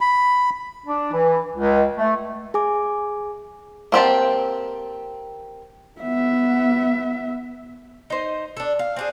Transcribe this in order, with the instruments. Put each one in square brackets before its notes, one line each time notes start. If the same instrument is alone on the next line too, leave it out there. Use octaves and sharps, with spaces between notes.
[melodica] B5
[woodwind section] D4
E3
C#2
A3
[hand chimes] G#4 G#5 D6
[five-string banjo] A#3 C4 G4 A5
[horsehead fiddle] B3 E5
[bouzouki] D#4 C5
D4 A4
F5
C4 D4 G#4